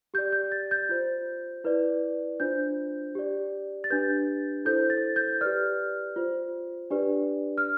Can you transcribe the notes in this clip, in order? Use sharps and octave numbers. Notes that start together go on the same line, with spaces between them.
G4 D5 G6
G6
A6
G6
F4 C5
E4 B4 D5
D4 F4 C5 G6
G4 D5
A6
D4 G4 B4 G6
E4 A4 C5 G6
A6
G6
G4 B4 D5 F6
F4 C5
D4 G4 B4 D5
F6